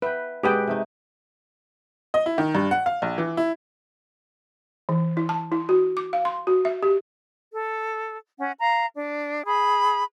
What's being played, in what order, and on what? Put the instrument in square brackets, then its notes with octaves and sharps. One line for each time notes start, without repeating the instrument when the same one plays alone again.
[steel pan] B4 [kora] E5 G5
[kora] B2 B3 [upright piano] G#3 D#6 [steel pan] G4 B4 G5
[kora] C3 A3 D#4
[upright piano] D#5
E4
D#3
G2
F#5
F5
A#1
E3
E4
[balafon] E3
E4
A5
E4
F#4
D6
F5
C6
F#4
E5
G4
[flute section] A4
C#4 F#5
F5 A#5
D4
G#4 B5